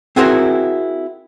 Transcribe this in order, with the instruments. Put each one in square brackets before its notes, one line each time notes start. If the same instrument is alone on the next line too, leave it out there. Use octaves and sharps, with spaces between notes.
[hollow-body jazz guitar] C4 E4 F#4 G#4 A#4 C5